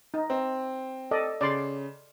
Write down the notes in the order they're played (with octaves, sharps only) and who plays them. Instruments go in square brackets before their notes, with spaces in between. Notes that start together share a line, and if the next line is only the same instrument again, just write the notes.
[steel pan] D#4
[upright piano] C4
[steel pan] A4 D5 D#5
[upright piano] C#3 [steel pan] D5 C6